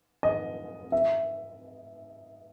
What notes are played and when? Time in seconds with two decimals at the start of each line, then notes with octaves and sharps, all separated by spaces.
0.23 D#5
0.92 E5